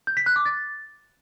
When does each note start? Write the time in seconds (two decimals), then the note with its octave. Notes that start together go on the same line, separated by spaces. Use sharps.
0.07 G6
0.17 B6
0.26 F#6
0.36 D6
0.46 A6